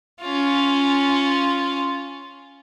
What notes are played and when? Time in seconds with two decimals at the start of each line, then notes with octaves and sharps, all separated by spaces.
0.22 C#4 F4